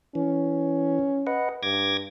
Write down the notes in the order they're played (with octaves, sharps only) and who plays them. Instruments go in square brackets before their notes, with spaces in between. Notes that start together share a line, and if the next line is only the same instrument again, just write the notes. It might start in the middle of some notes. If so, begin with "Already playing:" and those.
[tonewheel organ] E3 [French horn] C#4
[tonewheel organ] B4 D#5 F#5
[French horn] G2 [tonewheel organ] D6 G#6 A#6